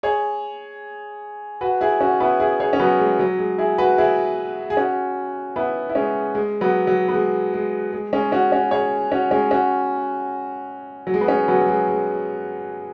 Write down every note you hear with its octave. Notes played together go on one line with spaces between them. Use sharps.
G#4 C#5
F#4 B4
E4 G#4
C#4 F#4
B3 E4
E4 G#4
G#4 C#5
C#4
F#3 B3
G#3
F#3
G#3
E4 G#4
F#4 B4
E4 G#4
G#4
C#4 F#4
B3 E4
E4
G#3 C#4
G#3
F#3 B3
F#3
B3
G#3
G#3
G#3
G#3 C#4
C#4 F#4
C#4 F#4
G#4 C#5
C#4 F#4
G#3 C#4
C#4 F#4
F#3
G#3
B3
G#3 C#4
F#3 B3
F#3
G#3
G#3